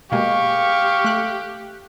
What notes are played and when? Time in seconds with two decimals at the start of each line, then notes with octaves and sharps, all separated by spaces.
0.12 B2 G#3 A#3 G4 F5 C#6
1.04 A3 F#6